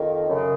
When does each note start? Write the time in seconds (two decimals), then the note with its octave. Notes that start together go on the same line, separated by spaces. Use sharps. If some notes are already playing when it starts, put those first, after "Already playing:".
Already playing: F2 D#3
0.28 F#2 C#3